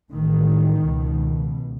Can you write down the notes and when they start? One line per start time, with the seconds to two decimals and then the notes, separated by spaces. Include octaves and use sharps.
0.12 A1 A2 D#3
0.85 C#2 B2